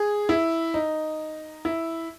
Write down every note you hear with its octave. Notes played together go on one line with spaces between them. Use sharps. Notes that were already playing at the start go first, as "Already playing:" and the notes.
Already playing: G#4
E4
D#4
E4